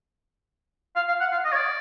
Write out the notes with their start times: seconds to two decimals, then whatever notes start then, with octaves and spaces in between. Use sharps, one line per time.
0.96 F5
1.08 F5
1.20 F#5
1.32 F5
1.45 D#5
1.52 C#5
1.56 D5